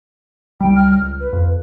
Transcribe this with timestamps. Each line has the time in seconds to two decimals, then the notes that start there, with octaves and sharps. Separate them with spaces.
0.61 C2 G3 G5
0.75 F6
0.91 C#2 F6
1.20 B4
1.33 F2